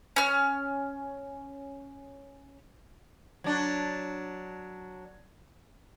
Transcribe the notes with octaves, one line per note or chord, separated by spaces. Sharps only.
C#4 F6
F#3 D4